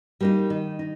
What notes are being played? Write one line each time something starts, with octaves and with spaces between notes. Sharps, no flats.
G3 A#3 D#4
D#3
D#4